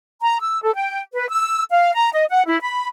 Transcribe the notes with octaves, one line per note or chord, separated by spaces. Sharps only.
A#5
E6
A4
G5
B4
E6
F5
A#5
D#5
F#5
E4
B5